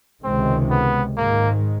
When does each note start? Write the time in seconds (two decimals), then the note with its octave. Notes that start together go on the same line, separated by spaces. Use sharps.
0.24 C#2 C3 D#3 G#3 C4
0.70 B3
1.17 G#2 D#3 G#3 A#3